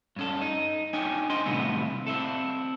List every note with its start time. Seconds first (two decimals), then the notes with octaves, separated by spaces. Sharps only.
0.16 G2 C#4 A4
0.41 D#4
0.93 D4 D#4 C#5 G5 G#5
1.30 C#4 D4 C5 D#5 G#5 C6
1.46 D#2 A2 C3 G3 B3 C4
2.07 C4 E4 A4